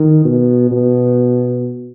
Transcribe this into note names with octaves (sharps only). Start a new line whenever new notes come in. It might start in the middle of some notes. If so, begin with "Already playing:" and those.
Already playing: D#3
B2
B2